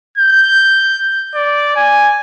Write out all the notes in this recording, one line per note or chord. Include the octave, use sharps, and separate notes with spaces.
G6
D5
G#5